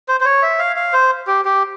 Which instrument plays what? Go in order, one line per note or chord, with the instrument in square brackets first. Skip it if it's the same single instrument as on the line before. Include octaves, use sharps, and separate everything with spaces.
[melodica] C5
C5
C#5
E5
F5
F5
C5
G4
G4